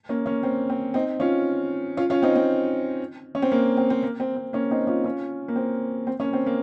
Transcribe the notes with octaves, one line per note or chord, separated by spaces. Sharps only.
A#3 C#4
A#3 C#4
C4
C4
C4 D#4
C#4 F4
C#4 F4
C#4 F4
C4 D#4
C4
C#4
C4
A#3
C4
C4
A#3
C4
C4
A#3 C#4
C4 D#4
C#4 F4
C#4 F4
A#3
C4
C4
A#3 C#4
C4
A#3